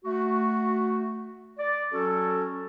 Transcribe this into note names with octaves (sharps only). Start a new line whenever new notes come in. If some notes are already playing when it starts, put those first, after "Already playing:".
A3 F#4
D5
F#3 C#4 F#4 A4